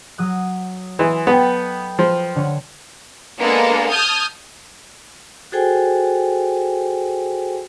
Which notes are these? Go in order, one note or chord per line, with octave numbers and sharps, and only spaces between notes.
F#3 D#6 F#6
E3 D#5 G#5 C6
B3 A4 B4 G5
F3
D3 C#5
G#3 A#3 B3 D4 A4
A5 D#6 F6 G6 G#6
F#4 G#4 A4 C5 G5 G#5